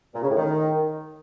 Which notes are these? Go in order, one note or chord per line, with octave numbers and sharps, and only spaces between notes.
A#2
C#3
A2
D#3